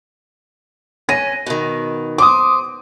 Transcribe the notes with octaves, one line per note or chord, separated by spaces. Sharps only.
C#4 A#6 D#7
B2 D#3
C5 D6 D#6